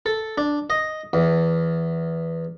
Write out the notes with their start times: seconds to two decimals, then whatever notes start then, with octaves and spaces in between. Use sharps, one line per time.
0.06 A4
0.38 D4
0.70 D#5
1.13 E2